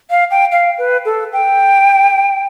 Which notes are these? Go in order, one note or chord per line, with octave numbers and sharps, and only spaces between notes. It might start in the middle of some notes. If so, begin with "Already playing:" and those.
F5
G5
F5
B4
A4
G5